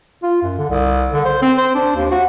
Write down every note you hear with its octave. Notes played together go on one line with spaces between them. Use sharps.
F4
F#2
D3
C2
D3
C5
C4
C5
D4
D#2
F#4